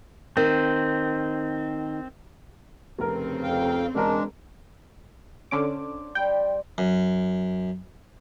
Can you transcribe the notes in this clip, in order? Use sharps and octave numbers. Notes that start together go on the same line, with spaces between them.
D#3 C4
F1 C#3 C4 A#4
F2 F5 G5
E1 G#3 D4 A#4
D3 C#4 D4 C5 D5 D6
G3 C5 G5
F#2